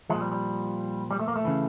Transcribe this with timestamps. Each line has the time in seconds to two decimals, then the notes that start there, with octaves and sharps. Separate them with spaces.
0.10 A#2 F3 G#3
0.21 G3
0.32 G3
1.11 G3
1.19 A3
1.28 A#3
1.36 A3
1.45 C#3 E3